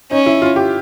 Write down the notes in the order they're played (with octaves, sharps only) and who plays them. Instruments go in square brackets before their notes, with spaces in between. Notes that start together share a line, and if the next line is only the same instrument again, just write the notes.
[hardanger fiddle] C#4 [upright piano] D#4
[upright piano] E4
F4
G4